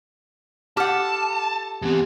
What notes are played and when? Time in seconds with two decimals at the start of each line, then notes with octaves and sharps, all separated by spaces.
0.77 F4 G4 A4 F#5 A5 F6
1.82 E2 B3 C4 G4